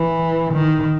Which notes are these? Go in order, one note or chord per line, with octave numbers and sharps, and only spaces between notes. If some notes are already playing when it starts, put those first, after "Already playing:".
Already playing: E3
D#3